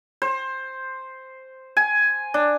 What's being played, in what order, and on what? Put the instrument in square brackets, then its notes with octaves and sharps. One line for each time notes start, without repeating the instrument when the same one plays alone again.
[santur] C5
G#5
D4